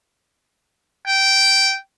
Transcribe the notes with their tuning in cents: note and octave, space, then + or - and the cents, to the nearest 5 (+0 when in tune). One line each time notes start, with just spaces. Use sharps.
G5 -10